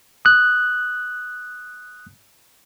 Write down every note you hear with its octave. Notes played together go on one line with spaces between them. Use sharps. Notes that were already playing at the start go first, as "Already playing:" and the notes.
D#6 F#6